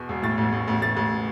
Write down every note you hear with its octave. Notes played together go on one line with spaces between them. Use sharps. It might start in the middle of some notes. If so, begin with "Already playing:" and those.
Already playing: E2 B2
E1
A2 A6
A1
A1
A1
A1 A6
A1